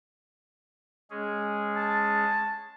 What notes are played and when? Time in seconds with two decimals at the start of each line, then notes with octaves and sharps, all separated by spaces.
1.10 G#3 C#4 G#4
1.76 A5